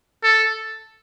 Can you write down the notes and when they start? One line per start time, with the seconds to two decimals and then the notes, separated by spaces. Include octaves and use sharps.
0.23 A4